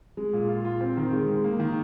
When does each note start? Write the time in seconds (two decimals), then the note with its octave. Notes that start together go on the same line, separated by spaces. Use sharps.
0.17 G#3
0.33 A#2
0.48 F4
0.65 F4
0.81 C4
0.97 D#3
1.13 G#3
1.29 G#3
1.44 A#3
1.60 D#3